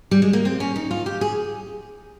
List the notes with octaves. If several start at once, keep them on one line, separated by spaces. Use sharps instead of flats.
G3
G#3
A#3
C4
C#4
D#4
F4
G4
G#4